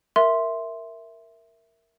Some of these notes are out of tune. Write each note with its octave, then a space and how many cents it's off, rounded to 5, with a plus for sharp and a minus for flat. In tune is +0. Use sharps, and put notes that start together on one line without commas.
A#4 +0 E5 +0 C6 +0